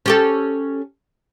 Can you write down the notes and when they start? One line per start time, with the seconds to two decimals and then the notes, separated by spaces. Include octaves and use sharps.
0.06 C#4 G4 A4